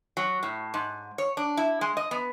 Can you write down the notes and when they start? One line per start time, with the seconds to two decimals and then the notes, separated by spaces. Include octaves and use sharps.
0.17 F#3
0.43 A2
0.74 G#2
1.18 C#5
1.37 D4
1.57 E4
1.81 G#3
1.97 D#5
2.11 B3